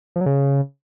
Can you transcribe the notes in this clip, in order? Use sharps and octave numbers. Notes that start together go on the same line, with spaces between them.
F3
F#3
C#3